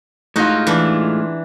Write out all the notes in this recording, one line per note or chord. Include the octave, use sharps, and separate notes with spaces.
A2 G#3 D#4 F4 F#4
E3 D4